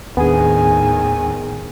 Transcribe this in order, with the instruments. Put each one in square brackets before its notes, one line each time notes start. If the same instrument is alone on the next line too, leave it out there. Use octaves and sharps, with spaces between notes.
[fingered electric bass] D#2 D4 [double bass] A2 D#3 [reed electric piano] B3 G#4 [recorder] G#5